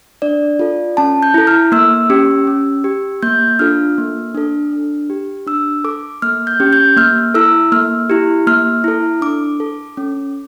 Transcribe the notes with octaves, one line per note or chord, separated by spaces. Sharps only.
D4 D5
F4 A4
C#4 A5
G6
E4 A4
F6
A#3 E6
C#4 G4
C#4
G4
A#3 G6
D4 F4 A4 F6
A#3
D4 A4
D4
G4
D4 E6
A4 D6
A#3 F6
G6
C#4 G4
G6
A#3 F6
E4 A4 E6
A#3 F6
E4 G4
A#3 F6
E4 A4
D4 D6
A4
C#4